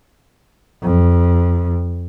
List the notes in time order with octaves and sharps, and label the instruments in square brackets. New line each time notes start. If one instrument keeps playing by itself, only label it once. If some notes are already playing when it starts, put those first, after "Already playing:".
[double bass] F2